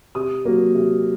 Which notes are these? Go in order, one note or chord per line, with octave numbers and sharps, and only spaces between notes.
C3 D#6
F#3 A#3
C3